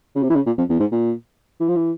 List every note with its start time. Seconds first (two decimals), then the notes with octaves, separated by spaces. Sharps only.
0.15 C#3
0.23 C3
0.30 E3
0.35 C#3
0.46 A#2
0.58 F2
0.69 E2
0.80 G#2
0.92 A#2
1.60 E3
1.68 F3
1.76 E3